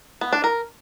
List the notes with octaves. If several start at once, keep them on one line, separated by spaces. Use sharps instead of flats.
B3
D4
A#4